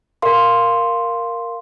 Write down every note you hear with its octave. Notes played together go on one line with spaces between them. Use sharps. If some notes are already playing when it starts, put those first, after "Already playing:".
A#4 F5 C6